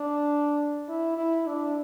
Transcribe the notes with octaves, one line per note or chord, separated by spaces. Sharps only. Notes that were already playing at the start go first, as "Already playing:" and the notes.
Already playing: D4
E4
E4
D4